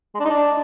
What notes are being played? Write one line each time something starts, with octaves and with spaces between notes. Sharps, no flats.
G#3
D4
D#4
D4